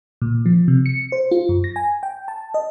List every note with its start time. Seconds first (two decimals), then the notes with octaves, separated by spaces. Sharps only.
0.22 A#2
0.46 F3
0.68 C3
0.86 C#7
1.12 C5
1.31 F4
1.49 F#2
1.64 A#6
1.76 G#5
2.03 G5
2.28 A5
2.54 D#5